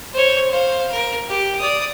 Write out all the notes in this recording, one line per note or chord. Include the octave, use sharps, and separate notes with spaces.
C5 C#5
C5 F5
A#4
G4
D5 D#6